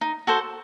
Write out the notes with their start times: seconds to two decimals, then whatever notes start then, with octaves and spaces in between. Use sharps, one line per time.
0.01 D#4
0.27 F#4 A4 C5